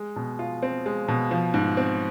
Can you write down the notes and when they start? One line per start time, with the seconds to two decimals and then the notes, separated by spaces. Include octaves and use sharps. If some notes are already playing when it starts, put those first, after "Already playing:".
Already playing: G#3
0.16 B2
0.39 F4
0.62 C4
0.86 G#3
1.08 B2
1.31 F3
1.54 G#2
1.77 C4